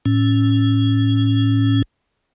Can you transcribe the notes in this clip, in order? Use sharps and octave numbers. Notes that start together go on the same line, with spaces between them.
A2 C#4